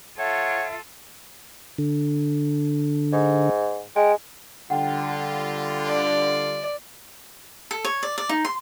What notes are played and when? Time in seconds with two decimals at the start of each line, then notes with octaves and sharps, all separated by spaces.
0.19 F4 A4 C#5 E5 F#5
1.78 D3
3.13 G#2
3.96 G#3 G5
4.70 D3 G3 F4 F#5 G5
5.88 D5
7.71 A4
7.85 C#5
8.03 D5
8.18 D5
8.29 D#4
8.45 C6